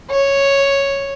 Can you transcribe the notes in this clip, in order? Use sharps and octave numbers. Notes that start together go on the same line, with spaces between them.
C#5